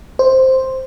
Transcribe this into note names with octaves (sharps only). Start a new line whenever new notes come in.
C5